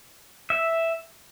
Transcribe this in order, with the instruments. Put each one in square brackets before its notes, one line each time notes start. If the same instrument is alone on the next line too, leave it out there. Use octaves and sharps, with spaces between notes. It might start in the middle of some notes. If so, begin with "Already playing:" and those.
[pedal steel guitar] E5